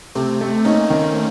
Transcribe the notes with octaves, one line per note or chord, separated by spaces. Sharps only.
C3 A3 C4
A3
A#3 C#4 D#4
D#3